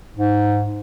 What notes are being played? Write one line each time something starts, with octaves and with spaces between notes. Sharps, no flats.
G#2